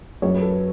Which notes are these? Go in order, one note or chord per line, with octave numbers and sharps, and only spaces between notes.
F#2 C#5
B4
A4